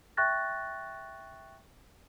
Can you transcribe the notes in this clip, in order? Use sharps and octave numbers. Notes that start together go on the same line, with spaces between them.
E5 G5 C#6 F#6 A6 A#6